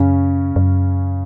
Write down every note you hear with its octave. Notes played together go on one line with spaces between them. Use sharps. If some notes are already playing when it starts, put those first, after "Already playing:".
Already playing: F#2 C#3 C#4
F#2